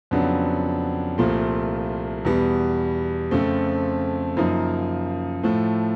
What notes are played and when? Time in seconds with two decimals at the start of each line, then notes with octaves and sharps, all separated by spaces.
0.11 F2 C#3 F#3 B3 D4
1.18 C2 A#2 F3 A3
2.25 E2 B2 G3
3.31 F2 C#3 F3 A3 C4
4.37 F#2 C#3 F3 A#3 D#4
5.43 A2 F3 A3